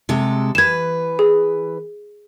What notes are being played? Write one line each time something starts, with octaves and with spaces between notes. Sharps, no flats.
C3 G#3 A4
E3 B4 G#6 E7
G#4